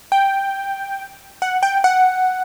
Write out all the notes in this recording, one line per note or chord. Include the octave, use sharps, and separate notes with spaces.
G5
F#5
G5
F#5